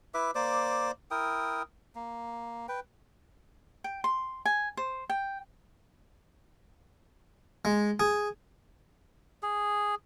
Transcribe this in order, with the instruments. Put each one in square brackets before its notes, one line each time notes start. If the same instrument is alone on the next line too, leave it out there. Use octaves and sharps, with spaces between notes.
[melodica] E4 B4 E5 D6
A#3 C5 D5 D6
E4 A#4 G5 D#6
A#3
B4 G5
[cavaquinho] G5
C6
G#5
C5
G5
[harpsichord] G#3
G#4
[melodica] G#4